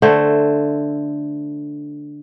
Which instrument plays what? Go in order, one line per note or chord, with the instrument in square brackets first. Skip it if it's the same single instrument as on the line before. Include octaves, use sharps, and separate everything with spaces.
[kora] D3 A3 C5